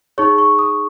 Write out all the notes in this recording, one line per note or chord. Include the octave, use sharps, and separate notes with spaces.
D#4 G#4 C#5 C#6
C#6
D#6